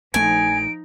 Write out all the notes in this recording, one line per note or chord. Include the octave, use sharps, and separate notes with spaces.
A#1 F3 A3 D#4 G#5 D7